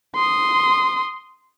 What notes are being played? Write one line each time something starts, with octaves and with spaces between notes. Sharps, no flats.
C6 D#6